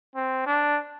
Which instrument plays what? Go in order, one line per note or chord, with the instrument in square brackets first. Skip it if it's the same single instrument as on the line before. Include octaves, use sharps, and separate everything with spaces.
[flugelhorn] C4
D4